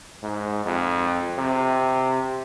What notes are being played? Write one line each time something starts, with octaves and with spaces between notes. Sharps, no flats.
G#2
F2
C3